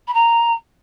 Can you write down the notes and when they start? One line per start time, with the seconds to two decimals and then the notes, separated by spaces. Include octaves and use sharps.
0.07 B5
0.13 A#5